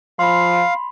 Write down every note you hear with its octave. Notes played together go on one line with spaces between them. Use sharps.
F3 F5 B5 C6